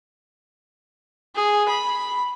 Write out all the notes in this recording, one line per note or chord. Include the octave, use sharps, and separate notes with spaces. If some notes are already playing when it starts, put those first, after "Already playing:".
G#4
B5